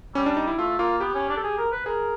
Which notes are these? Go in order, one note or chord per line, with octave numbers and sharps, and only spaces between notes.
G3 C#4
D4
D#4
E4
A3 F4
A#3 F4
B3 G4
C#4
D4
A4
G#4
A#4
B4
G#4 A#4